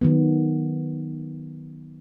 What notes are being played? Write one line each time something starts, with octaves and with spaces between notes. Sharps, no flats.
D#3 F#3 B3